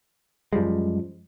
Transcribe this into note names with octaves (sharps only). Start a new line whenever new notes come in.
F#2 F3 G3 G#3